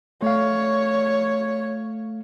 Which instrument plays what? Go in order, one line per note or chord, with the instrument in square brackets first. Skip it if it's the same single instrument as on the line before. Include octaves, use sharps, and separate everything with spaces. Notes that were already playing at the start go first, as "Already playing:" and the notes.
[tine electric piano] A3 F5 [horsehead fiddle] C#5